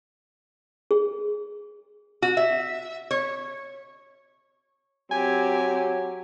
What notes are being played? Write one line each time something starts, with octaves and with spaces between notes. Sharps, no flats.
G#4
F#4
E5
C#5
F#3 C4 G4 G#5